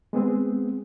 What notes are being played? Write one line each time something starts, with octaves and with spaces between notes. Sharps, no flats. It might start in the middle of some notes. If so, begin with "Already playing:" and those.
G#3 B3 C4 G#4